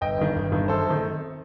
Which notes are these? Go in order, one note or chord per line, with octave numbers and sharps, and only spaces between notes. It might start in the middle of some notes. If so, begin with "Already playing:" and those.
G1 D#5 G5
G2 D#3
G1
G2 D#3
F#2 A4 C5
D#3 A3 C4